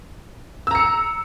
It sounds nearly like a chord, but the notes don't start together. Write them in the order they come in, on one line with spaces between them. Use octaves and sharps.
E6 A#5 C#7